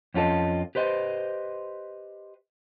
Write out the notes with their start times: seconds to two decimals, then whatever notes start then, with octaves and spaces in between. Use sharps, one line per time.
0.14 F2 C#4 F4 A4 D#5
0.75 G4 B4 C5 D#5